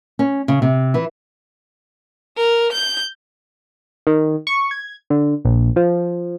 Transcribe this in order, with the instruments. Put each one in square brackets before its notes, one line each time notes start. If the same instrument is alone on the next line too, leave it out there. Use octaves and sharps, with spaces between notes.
[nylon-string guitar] C#4
C#3
C3
E3
[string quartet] A#4
G6
[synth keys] D#3
C#6
G#6
D3
A#1
F3